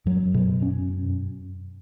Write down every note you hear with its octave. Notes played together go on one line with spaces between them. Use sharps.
F#2 F#3
B2
C#4